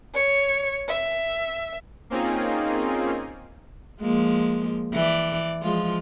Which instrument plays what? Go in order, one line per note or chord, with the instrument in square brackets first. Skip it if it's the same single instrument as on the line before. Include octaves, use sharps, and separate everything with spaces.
[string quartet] C#5
E5
[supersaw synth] A#3 C4 C#4 D#4 F4 G#4
[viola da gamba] F3 G#3 A#3
E3 D5
F3 G#3 F4